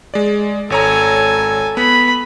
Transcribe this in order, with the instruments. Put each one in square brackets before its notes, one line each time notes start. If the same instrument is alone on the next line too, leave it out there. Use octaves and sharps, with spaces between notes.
[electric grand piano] G#3 D5
[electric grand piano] G#1 C#5 A#5 [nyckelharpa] A4 G#5
[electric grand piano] B3 [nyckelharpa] B5